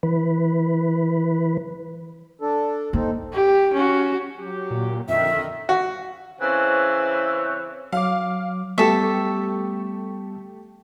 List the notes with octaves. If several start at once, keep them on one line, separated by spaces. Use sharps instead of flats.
E3 B4
D4 A4
A#3 C4 D#4 A4
G4
C#4 F#4
F#3 G4
A#2
F2 D3 D#3 E5
F#4
C#3 E3 C4 B4 C#5
F#3 F5 D6
G3 A3 B3 G4 A4 E5 C#6